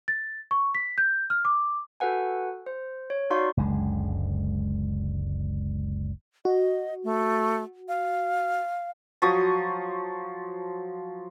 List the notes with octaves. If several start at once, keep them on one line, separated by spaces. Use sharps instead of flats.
A6
C#6
B6
G6
F6
D6
F#4 A4 B4 F#5 G#5
C5
C#5
D#4 F#4 D5 F5 C6 C#6
F#1 C#2 D3 G#3
F#4 D#5
A3
F5
F3 F#3 C#6 D#6